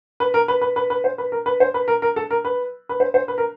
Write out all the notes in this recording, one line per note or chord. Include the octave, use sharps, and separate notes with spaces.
B4
A#4
B4
B4
B4
B4
C5
B4
A#4
B4
C5
B4
A#4
A#4
A4
A#4
B4
B4
C5
C5
B4
A#4